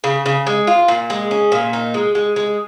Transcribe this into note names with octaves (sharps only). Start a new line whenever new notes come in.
C#3
C#3
G#3
F4
A#2
G#3
C#4
A#2
D#4
G#3
G#3
G#3